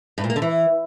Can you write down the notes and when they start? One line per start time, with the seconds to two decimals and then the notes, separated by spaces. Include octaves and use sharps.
0.18 G2
0.24 A#2
0.30 A#3
0.36 D3
0.42 E3